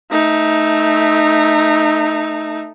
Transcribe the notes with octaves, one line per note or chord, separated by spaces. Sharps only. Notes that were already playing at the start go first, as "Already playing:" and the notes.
A3 D#4